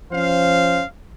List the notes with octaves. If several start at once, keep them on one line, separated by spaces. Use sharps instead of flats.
F3 C#4 C5 F5